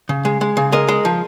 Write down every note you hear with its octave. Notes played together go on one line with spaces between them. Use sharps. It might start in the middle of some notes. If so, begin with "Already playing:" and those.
C#3
G#3
G#3
C#3
G#3 A#4 D#5
G#3
F3